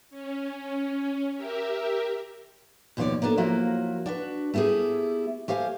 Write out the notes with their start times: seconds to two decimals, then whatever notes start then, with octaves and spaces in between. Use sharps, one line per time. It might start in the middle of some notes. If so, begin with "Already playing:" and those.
0.10 C#4
1.37 G4 A#4 E5
2.97 D#2 B2 F3 F4 C#5 D5
3.22 A#3 B3 D4 G#4 A4
3.37 F3 F#3 A#3 E4 F#4
4.06 D4 F#4 B4
4.54 A3 B3 E4 G4 G#4
5.48 A3 G4 C5 F5 G#5